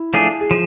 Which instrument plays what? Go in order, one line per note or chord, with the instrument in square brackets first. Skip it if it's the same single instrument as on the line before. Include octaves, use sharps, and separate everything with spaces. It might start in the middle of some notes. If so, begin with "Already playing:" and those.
Already playing: [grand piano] E4
[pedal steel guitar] F3 A3 D4 G#4
[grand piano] G#4
[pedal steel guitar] F3